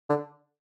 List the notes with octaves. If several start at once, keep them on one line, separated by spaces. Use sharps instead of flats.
D3